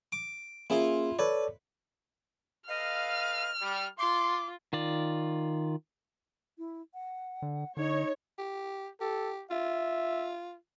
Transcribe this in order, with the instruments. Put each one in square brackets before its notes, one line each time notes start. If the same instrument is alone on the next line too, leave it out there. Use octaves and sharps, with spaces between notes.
[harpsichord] D6
[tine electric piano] A#3 C#4 G#4 [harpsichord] E4 F4
[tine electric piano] A4 C#5 D5 [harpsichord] B4
[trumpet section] A4 B4 F5 [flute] D#5 [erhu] F6
[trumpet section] G3
[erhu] F4 [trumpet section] C6 [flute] D6
[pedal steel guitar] D#3 F4 D5
[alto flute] E4
F#5
[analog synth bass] D3
[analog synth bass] D3 [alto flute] D#4 [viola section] C#5
[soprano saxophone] G4
[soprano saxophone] G4 [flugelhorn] A4
[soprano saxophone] F4 [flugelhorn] E5